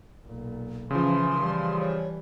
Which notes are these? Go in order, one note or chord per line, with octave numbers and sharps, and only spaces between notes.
B1 A#2
C#3 E3 F3 C#4 C6
E3 G3
C#5